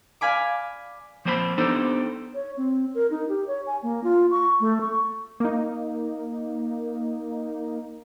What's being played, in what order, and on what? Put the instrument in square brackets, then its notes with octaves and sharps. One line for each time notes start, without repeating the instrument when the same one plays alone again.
[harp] D5 F5 G#5 B5 D6
[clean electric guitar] F3 A#3 C4 C5 G#5 B5
B3 D4 D#4 G4 A4 C5
[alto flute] C#5
C4
A#4
D#4
G4
C#5
G#5
A#3
F4
C#6
A3
C#6
[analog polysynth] A#3 D#4